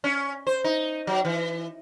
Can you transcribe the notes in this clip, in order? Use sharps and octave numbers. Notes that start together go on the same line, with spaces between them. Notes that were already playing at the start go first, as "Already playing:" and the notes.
C#4
C5
D#4
F#3
E3